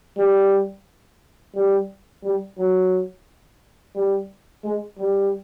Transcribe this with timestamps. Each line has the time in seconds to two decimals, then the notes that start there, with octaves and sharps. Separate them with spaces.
0.17 G3
1.55 G3
2.23 G3
2.58 F#3
3.95 G3
4.64 G#3
4.98 G3